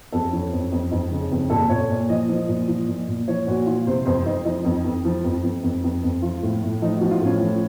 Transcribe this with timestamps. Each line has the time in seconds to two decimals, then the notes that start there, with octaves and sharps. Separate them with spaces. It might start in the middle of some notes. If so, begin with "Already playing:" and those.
0.12 F2 A4
0.32 F3 C#4
0.52 F2
0.72 F2
0.91 F2 D#4
1.11 C#3
1.31 F2
1.50 A#2 A4
1.70 A#2 C#5
1.90 A#2
2.09 F3 D#5
2.29 F3
2.48 A#2
2.68 F3
2.88 A#2
3.08 A#2
3.28 F3 C#5
3.47 A#2 F#4
3.66 F3 F4
3.87 C3 C5
4.06 F2 C5
4.25 F2 D#4
4.45 F3 D#4
4.65 F2
4.85 F2
5.05 F3
5.24 F2
5.43 F2
5.63 F2
5.84 F2
6.03 F2
6.22 F3 F4
6.43 A2
6.63 A2
6.82 F3 D#4
6.97 F3 F#4
7.11 F4
7.21 A2 C#4
7.40 F3